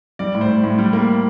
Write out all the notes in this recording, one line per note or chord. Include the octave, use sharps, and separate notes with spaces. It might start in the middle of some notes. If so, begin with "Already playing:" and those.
G3 D5
A2
C5
A2
A2
G3
A#3